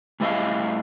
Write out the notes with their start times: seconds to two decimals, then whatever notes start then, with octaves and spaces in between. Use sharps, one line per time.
0.20 A2 G3 E4 C#5 D#5 F5